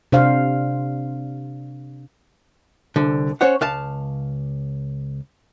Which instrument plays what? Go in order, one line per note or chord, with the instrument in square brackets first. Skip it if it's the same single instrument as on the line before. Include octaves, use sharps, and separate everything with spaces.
[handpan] C3 D4 C5 F5
[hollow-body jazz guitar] C2 D3
C#4 C5 C#5 F#5
C#2 F5 A5